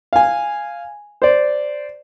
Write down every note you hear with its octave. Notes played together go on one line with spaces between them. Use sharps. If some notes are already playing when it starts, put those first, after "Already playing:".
F5 G#5
C5 D5